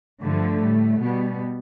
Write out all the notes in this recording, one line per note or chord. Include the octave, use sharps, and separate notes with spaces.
G2 D3 F3 A3
A2 G3
B2 G3 B3